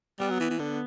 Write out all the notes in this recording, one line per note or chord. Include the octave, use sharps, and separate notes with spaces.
G3 B3
F#3
E3
E3
D3 B3